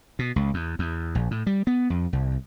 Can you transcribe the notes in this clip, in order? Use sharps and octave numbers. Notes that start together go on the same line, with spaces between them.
B2
C#2
E2
E2
A#1
A2
G3
B3
F2
C2